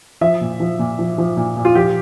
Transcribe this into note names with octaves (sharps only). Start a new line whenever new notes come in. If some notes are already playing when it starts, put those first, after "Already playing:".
F3 E5
A#2
F3
A#2
F3
F3
A#2
A#2
F4
F3 G4